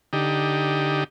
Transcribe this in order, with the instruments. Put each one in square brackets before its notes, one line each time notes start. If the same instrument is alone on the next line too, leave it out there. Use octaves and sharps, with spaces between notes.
[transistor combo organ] D3 D#4 G4